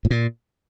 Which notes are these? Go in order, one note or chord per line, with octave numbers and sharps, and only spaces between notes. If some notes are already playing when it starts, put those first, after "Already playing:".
A2
A#2